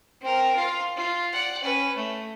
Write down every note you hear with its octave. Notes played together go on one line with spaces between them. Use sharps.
C4 A#4
F4 F5
F4
D5 F#5
C#4 B4
A3